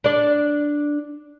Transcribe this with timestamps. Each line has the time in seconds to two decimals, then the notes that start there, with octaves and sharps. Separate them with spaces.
0.04 D4 D5